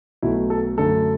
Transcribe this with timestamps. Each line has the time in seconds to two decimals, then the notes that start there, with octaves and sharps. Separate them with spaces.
0.22 B1 B2 A3 E4
0.50 A4
0.78 F#2 D3 A3 A4